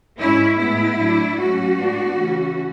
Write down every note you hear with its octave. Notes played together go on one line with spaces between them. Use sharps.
G#2 G#3 C#4 E4
A2 G#3 B3 E4
A2 F#3 A3 D4
G#2 F#3 A3 C#4 F#4
A2 G#3 B3 D4
C#3 E3 A3 C#4